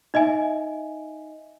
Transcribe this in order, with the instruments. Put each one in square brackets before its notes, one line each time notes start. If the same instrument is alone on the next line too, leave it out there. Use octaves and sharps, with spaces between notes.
[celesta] D#4 D#5 E5 G#5